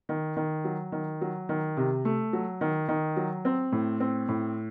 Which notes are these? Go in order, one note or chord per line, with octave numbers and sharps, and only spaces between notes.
D#3
D#3
F#3
D#3
F#3
D#3
C3
A3
F#3
D#3
D#3
F#3
C4
A2
C4
A2